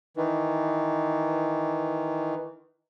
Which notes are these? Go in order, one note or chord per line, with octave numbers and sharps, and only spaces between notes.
D#3 E3